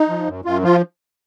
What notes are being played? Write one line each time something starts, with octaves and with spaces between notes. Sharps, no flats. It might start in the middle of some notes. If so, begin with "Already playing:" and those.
Already playing: D#4
F3
F#2
F#2 F4
F3 F4